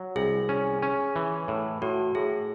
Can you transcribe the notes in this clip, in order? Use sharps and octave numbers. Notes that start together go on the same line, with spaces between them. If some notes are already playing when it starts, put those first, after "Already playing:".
Already playing: F#3
C2 G#4
C#4
C#4
E3
A2
A2 F#4
A2 G#4